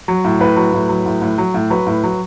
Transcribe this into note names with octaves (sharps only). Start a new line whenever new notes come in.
F#3
A2
A2 B4
F#3
A2
F#3
A2
A2
F#3
A2
F#3 B4
A2
F#3